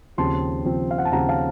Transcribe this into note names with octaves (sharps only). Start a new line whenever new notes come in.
D#2 C#3 F3 C4 A5 C6
D#2 C#3 F3 C4
F5
F#5
A5
D#2 C#3 F3 C4 F#5 A#5
F5 A5